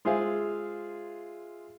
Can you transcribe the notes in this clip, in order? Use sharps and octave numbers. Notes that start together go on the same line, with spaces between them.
G#3 F4 G#4 C5 E5 F5